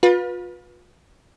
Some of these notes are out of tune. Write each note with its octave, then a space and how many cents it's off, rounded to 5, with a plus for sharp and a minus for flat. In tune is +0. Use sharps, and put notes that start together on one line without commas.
F4 +40 B4 -15